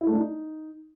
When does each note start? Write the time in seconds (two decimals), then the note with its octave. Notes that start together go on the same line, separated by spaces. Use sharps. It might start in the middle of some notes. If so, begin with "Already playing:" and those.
0.01 E4
0.07 A3
0.12 D4
0.18 D#4